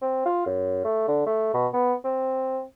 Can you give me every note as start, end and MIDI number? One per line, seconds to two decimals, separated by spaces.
0.02 0.23 60
0.26 0.45 65
0.46 0.82 42
0.84 1.07 57
1.08 1.25 50
1.26 1.53 57
1.54 1.67 47
1.73 1.94 59
2.04 2.62 60